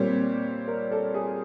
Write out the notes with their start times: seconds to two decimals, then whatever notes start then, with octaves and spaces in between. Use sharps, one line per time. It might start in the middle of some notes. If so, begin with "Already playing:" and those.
Already playing: A#2 G3 C4 C#5
0.68 A#4
0.92 A4
1.14 G#4